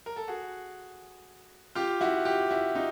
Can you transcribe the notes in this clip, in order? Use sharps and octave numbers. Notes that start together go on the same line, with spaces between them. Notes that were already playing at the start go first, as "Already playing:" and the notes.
A#4
A4
F#4 G#4
F4 G4
E4 F#4
F4 G4
E4 F#4
D#4 F4